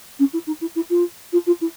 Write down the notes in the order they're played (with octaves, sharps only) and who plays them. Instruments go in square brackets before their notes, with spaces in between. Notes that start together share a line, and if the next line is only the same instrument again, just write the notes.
[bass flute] C#4
E4
D#4
E4
E4
F4
F4
F4
E4